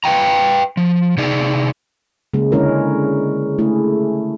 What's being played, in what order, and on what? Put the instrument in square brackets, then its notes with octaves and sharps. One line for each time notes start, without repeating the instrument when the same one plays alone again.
[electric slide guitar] B4 F5 G5 A#5
F3
C3 D#4 G#4 D5
[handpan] C#3 G#3 A#3
D3 G#3 C#4 E4 A#4
A3 E4 G#4